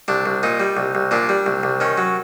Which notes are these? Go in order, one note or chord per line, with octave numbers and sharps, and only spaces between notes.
C2 D4
C2
A#2 D#4
G3
C2
C2
A#2 D4
G3
C2
C2
D#3 C#4
F#3